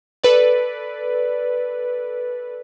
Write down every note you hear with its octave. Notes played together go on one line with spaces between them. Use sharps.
A4 B4 D5